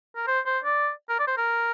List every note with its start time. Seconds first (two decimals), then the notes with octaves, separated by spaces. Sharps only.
0.16 A#4
0.27 C5
0.46 C5
0.64 D5
1.09 A#4
1.19 D5
1.27 C5
1.37 A#4